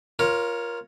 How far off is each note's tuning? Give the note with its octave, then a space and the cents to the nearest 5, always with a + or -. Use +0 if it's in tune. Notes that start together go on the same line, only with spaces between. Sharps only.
F4 +0 A#4 +20 C#5 +0